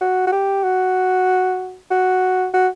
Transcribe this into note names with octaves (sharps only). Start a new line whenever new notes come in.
F#4
F#4
G4
F#4
F#4
F#4